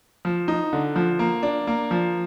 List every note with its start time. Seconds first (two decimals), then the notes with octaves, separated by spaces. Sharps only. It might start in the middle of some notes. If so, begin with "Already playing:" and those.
0.25 F3
0.48 D#4
0.73 D3
0.96 F3
1.19 A#3
1.43 D4
1.67 A#3
1.91 F3